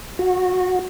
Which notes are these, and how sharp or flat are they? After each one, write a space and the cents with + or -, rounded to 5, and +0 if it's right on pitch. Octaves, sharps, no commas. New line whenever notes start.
F#4 -20